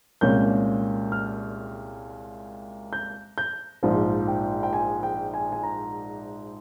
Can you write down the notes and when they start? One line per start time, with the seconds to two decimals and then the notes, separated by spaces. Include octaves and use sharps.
0.21 C2 A#2 G#3 C#4 G6
1.12 F6
2.93 G6
3.38 G6
3.83 A#1 G#2 F3
4.28 G5
4.63 G5
4.73 G#5
5.03 G5
5.34 G#5
5.52 G#5
5.63 A#5